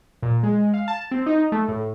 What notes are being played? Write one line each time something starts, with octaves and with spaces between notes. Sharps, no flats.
A#2
G#3
F5
A5
C4
D#4
A3
A2